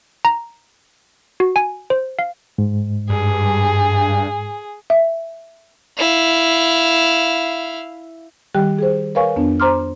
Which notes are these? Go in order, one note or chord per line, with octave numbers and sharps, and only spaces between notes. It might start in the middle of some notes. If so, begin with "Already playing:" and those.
A#5
F#4
G#5
C5
F5
G#2
G2 G#4
E5
E4 F5
D#3 G3 G4 G5 F#6
G#4 C5
A#4 B4 C#5 F5 G#5 C#6
F2 B3 D4
C5 A#5 C6 D6 F6